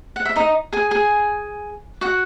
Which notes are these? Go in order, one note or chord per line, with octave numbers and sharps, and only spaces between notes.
F#5
E5
D#4 D#5
G#4 G#5
G#4 G#5
F#4 F#5